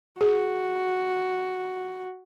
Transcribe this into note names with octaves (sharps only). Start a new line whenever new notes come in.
F#4 G#4